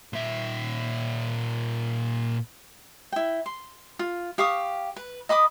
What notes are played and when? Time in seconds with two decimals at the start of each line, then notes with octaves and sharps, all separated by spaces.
0.13 A#2 E5
3.12 E4 G5
3.46 C6
3.99 F4
4.38 G4 F5 C#6 D#6
4.96 B4
5.29 D#5 B5 D6 D#6